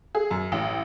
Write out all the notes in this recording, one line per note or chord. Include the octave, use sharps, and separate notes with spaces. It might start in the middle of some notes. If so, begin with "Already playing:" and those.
G#4
F#2
A1